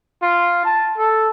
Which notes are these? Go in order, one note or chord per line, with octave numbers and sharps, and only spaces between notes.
F4
A5
A4